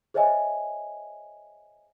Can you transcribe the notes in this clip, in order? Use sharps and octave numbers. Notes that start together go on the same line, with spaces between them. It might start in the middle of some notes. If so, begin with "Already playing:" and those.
G#4 C5 C#5 D#5 E5 G#5